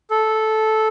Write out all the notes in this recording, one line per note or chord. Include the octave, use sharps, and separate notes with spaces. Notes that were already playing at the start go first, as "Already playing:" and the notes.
A4